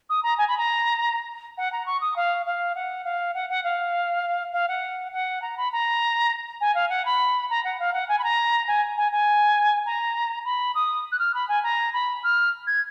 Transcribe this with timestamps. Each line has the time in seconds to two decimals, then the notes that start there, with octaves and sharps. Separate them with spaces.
0.09 D#6
0.23 A#5
0.38 G#5
0.48 B5
0.57 A#5
1.57 F#5
1.72 A#5
1.86 C#6
2.00 D#6
2.16 F5
2.46 F5
2.75 F#5
3.04 F5
3.34 F#5
3.49 F#5
3.63 F5
4.52 F5
4.68 F#5
5.12 F#5
5.42 A#5
5.57 B5
5.72 A#5
6.60 G#5
6.74 F5
6.89 F#5
7.05 B5
7.50 A#5
7.64 F#5
7.79 F5
7.93 F#5
8.08 G#5
8.18 B5
8.23 A#5
8.67 G#5
8.97 G#5
9.11 G#5
9.86 A#5
10.45 B5
10.74 D#6
11.11 F#6
11.19 F6
11.34 B5
11.48 G#5
11.63 A#5
11.93 B5
12.23 F6
12.67 G#6